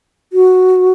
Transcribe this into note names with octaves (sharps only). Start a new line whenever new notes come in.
F#4